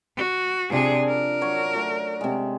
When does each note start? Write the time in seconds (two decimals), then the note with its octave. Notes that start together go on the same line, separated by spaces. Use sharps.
0.17 F#4
0.70 C3 F3 D4 G#4
1.07 A#4
1.41 F#3 C#5
1.74 A3 F#4 D5
2.21 C3 G#3